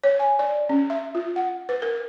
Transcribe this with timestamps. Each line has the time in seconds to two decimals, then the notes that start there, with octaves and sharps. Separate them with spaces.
0.04 C#5
0.19 G#5
0.39 D5
0.69 C#4
0.90 E5
1.15 F4
1.36 F#5
1.69 B4
1.82 A#4